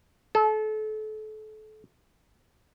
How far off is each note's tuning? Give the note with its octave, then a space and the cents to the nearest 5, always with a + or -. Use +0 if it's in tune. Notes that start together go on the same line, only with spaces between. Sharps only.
A4 -30